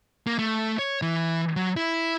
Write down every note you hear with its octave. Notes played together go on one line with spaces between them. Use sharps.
A#3
A3
C#5
E3
F#3
E4